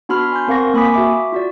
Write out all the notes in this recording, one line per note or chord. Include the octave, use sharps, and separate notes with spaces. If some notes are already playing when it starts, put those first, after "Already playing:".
B3 D4 F#4 B5 C6 F6
G#5 C6 G6
C4 A#4 F5 F#5 C#6 A#6
A#3 G#5 B5 D6 D#6 B6
F#4 E5 D6
F4 F#4 D5